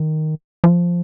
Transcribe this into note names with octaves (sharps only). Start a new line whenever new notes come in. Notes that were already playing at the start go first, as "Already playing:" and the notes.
Already playing: D#3
F3